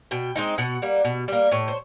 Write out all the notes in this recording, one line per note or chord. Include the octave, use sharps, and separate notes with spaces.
B2 G5
G#3 C4 D#4
B2 F#5
G3 A#3
B2
G3 A#3
A2 C#5
C5